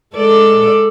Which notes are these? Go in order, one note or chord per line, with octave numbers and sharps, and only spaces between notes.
G#3 A4 D5